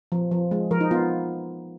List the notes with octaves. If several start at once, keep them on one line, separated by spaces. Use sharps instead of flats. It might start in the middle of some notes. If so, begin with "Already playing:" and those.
F3
F3
G#3
F3 A#4
D#4
B3 F4